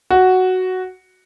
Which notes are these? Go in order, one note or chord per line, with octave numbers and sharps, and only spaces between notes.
F#4